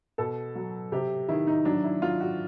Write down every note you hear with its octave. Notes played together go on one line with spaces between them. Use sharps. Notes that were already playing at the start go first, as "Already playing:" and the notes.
B2 A4
F#3
C3 G4
D#3 E4
D#4
F#3 D4
E4
F#3 F4
F#4